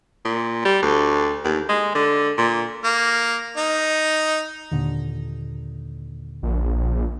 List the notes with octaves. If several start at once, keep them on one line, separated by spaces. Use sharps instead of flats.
A#2
G3
D2
D#2
G#3
D3
A#2
A#3
D#4
D#2 A#2 D3
A#1